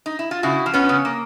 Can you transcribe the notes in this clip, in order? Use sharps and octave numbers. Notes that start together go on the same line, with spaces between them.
D#4
E4
F4
C#3 E4 F#4
F3
B3 C#4
C#3
A#3